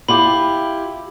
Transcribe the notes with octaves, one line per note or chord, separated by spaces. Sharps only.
E4 F4 G4 B5